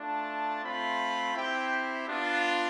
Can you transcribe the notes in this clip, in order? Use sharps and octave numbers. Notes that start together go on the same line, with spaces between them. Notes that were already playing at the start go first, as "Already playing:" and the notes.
Already playing: A3 D4 F4 A5
A3 C4 F4 B5
C4 E4 G4 G5
B3 D4 F4